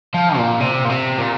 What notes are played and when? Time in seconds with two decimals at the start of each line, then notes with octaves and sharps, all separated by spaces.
0.14 F3
0.37 A#2
0.60 C3
0.85 A#2
0.89 C3
1.19 A#2